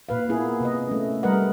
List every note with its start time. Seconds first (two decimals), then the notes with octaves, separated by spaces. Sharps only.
0.09 A#2 B4 F5
0.29 A#3 B3 E4 G#4
0.61 C3 B4 D#5
0.87 A3 C#4
1.23 G3 A3 A#4 B4 D#5 F#5